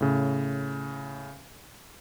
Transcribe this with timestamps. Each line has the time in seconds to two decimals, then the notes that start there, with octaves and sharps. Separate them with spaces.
0.01 A2 C#3